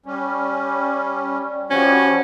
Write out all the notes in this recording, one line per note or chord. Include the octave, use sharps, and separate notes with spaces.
G3 C#4
F3 G3 C#4 F#4